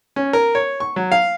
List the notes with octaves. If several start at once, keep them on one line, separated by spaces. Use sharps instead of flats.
C#4
A#4
C#5
C#6
F#3
F5